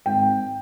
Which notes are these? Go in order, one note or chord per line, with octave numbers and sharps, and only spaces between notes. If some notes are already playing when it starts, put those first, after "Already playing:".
G#1 G5